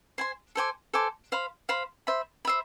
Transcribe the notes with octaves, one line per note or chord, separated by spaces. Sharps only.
C5 G#5 C6
A4 C5 G#5 D6
A4 C5 G#5 D6
C5 F5 B5
C5 F5 B5
C5 E5 B5
C5 E5 B5